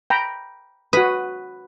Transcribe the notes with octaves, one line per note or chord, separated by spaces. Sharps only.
G5 A#5 B5
F#4 B4 D#6